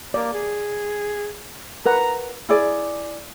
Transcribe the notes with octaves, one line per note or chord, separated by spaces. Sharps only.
A#3 D5
G#4
A#4 B4 F#5 A#5
E4 G#4 D5